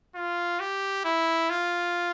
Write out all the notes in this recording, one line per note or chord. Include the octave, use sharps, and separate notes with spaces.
F4
G4
E4
F4